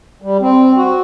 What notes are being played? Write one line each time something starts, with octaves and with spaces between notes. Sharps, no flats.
G3
C4
F#4